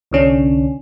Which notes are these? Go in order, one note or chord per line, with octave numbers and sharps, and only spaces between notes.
C2 D3 C#4 D4